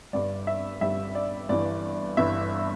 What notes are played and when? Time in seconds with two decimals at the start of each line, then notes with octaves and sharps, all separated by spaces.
0.13 G1 G2 G3 D5
0.47 E5
0.81 G1 G2 G3 E5
1.15 D5
1.49 G1 G2 E3 D5
2.17 G1 G2 E3 E5